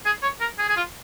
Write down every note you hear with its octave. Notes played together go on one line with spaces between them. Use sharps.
G#4
C#5
A#4
G#4
G#4
F4